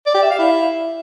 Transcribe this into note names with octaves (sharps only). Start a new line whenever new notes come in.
D5
G4
E5
F5
E4